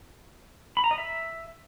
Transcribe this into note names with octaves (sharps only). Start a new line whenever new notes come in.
B5
A#5
D#5
E5